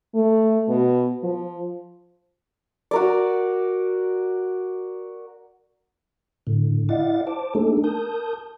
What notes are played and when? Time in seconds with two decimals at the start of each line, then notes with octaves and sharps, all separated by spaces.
0.15 A3
0.69 B2
1.23 F3
2.91 F#4 A#4 D5
6.47 A2 D3
6.89 E4 D5 D#5 F5 F#5 A6
7.27 C5 A5 D6
7.55 A3 A#3 D4 D#4 G#4 A4
7.84 A#4 A5 D#6 G6